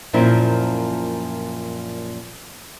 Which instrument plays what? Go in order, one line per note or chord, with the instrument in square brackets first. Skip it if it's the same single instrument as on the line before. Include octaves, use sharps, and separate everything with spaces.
[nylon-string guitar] F#2 A#2 F3 C4 E4